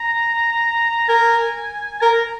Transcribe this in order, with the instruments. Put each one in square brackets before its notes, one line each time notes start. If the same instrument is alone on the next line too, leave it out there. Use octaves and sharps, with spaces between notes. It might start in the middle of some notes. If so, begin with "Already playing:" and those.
Already playing: [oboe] A#5
[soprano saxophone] A#4 [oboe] G#5
[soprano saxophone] A#4 [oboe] A#5